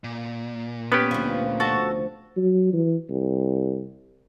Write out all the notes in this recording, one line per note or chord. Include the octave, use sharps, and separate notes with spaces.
A#2
B3 C#4 G4 B4
D2 F3
F#4 A4 A5
F#3
E3
C2